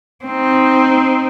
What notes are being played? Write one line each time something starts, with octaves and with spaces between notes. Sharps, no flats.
C4 D#4